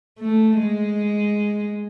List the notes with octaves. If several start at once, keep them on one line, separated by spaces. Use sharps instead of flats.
A3
G#3